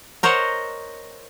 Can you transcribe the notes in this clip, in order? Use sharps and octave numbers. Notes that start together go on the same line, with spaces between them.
A#4 C5 C#5 D#5 F#5